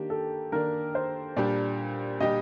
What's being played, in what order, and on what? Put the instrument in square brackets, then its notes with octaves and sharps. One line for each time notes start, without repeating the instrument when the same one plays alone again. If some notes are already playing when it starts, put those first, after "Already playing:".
Already playing: [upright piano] D#3 A#3 D4 [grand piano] G4
[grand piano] A4
[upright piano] D#3 A#3 D4 [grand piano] A#4
[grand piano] C5
[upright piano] A#2 G3 D4 G4 [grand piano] D5
[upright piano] A#2 G3 D4 G4 [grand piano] D#5